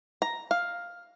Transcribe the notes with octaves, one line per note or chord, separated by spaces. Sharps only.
A#5
F5